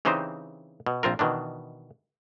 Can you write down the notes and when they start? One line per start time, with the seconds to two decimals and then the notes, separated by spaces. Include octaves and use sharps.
0.05 C#3 E3 C4 D#4 G4 C5
0.86 B2
1.03 A#1 C4 F4 A#4
1.19 B2 D#3 E3 D4